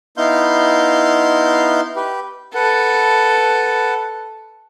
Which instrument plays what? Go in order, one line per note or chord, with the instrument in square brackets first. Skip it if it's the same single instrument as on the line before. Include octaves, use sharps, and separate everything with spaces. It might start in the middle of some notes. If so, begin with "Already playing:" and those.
[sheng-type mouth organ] B3 D#4 E4 F5 C6 G6
G4 B4
[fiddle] A4 [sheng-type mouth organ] B4 F#5